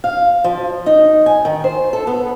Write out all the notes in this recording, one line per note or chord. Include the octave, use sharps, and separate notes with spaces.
F5
F3
D#4
G#5
D#3
C5
A4
B3